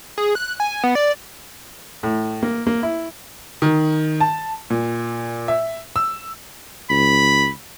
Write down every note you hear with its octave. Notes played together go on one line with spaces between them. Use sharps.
G#4
F#6
G#5
B3
D5
A2
A#3
A#3
E4
D#3
A5
A#2
E5
E6
C#2 B5